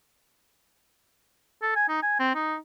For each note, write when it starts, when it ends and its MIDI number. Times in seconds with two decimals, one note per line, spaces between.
1.62 1.72 69
1.75 1.84 80
1.89 2.01 63
2.03 2.17 80
2.20 2.33 60
2.35 2.57 63